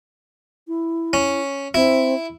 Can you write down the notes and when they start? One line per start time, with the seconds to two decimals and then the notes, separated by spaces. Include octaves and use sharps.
0.68 E4
1.13 C#4
1.74 C4 E4